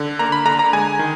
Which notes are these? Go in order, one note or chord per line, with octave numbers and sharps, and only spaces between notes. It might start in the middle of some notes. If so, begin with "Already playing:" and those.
Already playing: D3
A#3 A#5
B5
D3 A#5
A#5
G#3 G#5
D#3